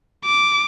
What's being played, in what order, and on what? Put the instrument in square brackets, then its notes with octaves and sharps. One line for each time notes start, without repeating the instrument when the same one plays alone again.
[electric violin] D6